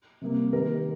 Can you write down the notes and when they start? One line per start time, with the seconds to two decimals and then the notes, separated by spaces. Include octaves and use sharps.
0.22 C3 G3 A#3
0.53 D#3 A#3 A#4
0.67 G4